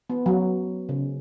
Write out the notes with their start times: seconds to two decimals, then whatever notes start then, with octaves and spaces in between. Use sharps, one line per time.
0.10 B3
0.26 F#3
0.89 C#3